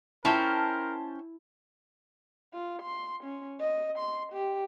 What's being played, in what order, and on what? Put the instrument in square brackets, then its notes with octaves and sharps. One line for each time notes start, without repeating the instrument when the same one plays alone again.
[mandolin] C#4 C5 G5 [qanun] E4 [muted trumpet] A#4 [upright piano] A5
[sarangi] F4
C6
C#4
D#5
C6
G4